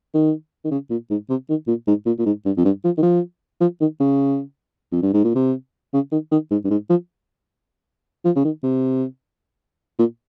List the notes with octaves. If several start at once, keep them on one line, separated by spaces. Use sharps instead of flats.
D#3
D#3
C#3
A#2
G#2
C3
D#3
A#2
G#2
A#2
A#2
G#2
G2
F2
G2
F3
D#3
F3
F3
D#3
C#3
F2
G2
G#2
A#2
C3
C#3
D#3
D#3
G#2
G2
G#2
F3
F3
C#3
D#3
C3
A#2